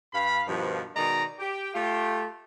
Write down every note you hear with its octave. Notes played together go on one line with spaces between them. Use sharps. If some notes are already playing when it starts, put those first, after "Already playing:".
G2 F5 B5
G2 B2 D#3 F3
B2 D#3 G#3 D#4 D5 A#5
G4
A3 F4 G4